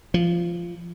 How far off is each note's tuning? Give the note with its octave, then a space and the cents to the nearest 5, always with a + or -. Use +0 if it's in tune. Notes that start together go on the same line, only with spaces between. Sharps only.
F3 -15